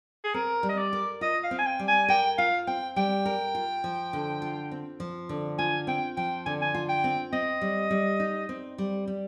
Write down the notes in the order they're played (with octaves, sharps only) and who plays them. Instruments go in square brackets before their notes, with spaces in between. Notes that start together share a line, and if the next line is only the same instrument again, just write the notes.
[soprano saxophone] G#4
[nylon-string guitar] C4 [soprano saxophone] A#4
[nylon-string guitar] G3
[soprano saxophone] D#5
D5
[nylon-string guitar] A#4
[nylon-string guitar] F4 [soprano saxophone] D#5
[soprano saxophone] F5
[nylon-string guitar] C4
[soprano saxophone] G#5
G5
[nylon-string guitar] G3
[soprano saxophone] G#5
[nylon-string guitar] A#4 [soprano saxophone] G5
[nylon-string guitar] F4 [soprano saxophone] F5
[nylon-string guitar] C4 [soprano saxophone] G5
[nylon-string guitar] G3 [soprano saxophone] G5
[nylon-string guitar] A#4
F4
F3
D3
F4
C4
F3
D3
[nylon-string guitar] F4 [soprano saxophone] G#5
[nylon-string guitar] C4 [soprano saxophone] G5
[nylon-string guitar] F3 [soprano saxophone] G5
[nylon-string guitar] D3 [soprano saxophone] G#5
[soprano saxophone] G#5
[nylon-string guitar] F4
[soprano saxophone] G5
[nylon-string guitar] C4
[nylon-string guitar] C4 [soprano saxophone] D#5
[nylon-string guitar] G3
G3
D#4
C4
G3
G3